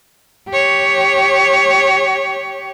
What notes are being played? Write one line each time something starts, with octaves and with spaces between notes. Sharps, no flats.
G4 C#5